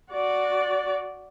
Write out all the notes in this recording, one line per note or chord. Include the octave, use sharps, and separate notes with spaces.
F#4 D5